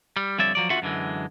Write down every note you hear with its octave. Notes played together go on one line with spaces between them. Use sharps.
G3
F2 D3 G3 C#5 D5 E5
F3 F#3 D5
D#2 D3 F4 F#4 E5 F#5
F#2 D3 E3 G#3